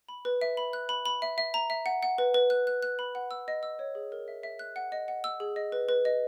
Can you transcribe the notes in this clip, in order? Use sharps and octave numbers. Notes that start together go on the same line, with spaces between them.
B5
B4
E5
B5
F#6
B5
B5
E5
E5
A#5
E5
F#5
F#5
B4
B4
F#6
F#6
F#6
B5
F#5
E6
D#5
E6
C#5
G#4
A#4
E5
E5
F#6
F#5
D#5
F#5
E6
G#4
D#5
B4
B4
D#5